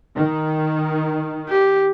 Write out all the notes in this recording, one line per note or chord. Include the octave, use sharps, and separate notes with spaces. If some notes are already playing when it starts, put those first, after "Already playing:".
D#3
G4